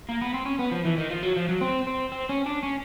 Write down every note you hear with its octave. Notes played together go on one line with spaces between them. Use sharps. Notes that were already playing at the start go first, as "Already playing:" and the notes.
A#3
B3
C4
C#4
B3
F3
E3
D#3
F3
F#3
F3
F#3
C4
C4
C4
C#4
D4
C#4